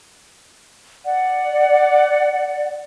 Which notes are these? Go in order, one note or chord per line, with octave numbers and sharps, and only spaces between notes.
D5 F#5